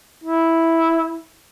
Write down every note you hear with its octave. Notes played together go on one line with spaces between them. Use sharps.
E4